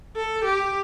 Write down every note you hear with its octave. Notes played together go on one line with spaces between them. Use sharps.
A4
G4